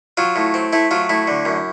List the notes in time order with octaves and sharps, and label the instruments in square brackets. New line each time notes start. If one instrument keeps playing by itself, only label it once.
[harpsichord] F#3 F4
A2
C4
A3 E4
F#3 F4
A2 E4
D3
F#2